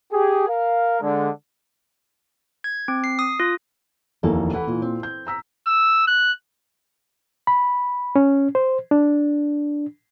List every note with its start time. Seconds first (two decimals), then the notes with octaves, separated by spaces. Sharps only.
0.12 G4 G#4
0.48 A#4 F5
1.01 D3 G#3
2.64 G#6
2.88 C4
3.04 C7
3.19 D#6
3.40 F4
4.23 F1 D#2 E3 A#3 D#4 A4
4.53 E3 A4 F#5 B5
4.67 A#2
4.82 C4
5.03 G6
5.27 A#5 E6 B6
5.67 E6
6.07 F#6
7.47 B5
8.16 C#4
8.55 C5
8.91 D4